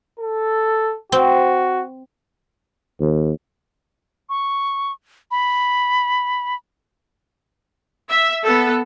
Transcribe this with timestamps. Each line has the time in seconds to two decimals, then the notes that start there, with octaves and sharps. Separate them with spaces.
0.19 A4
1.12 C4 F#4
3.01 D#2
4.29 C#6
5.31 B5
8.10 E5
8.44 B3 A4